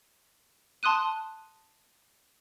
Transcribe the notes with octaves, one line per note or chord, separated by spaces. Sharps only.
A5 C6 D#6 F#6 D#7